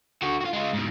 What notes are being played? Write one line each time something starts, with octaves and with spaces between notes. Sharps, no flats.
D3 F#4
F4 F#4
G#3 F4
G#2 B2